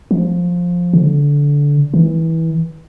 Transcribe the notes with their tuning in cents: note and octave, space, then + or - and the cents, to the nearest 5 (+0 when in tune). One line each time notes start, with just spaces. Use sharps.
F3 +10
D3 -20
E3 -20